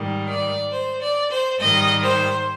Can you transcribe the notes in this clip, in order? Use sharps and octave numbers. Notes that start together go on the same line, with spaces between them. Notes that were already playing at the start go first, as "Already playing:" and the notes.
Already playing: G#2 D#3 G3
D5
C5
D5
C5
G#2 D#3 G3 D#5
C5